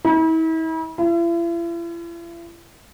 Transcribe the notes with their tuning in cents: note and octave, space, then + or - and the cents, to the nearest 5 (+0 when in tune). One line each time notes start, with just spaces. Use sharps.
E4 -40
E4 +45